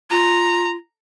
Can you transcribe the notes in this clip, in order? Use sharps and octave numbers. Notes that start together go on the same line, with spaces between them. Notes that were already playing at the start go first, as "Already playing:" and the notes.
F4 A#5